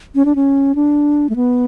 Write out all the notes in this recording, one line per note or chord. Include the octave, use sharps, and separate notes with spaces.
C#4
D4
C#4
D4
A3
B3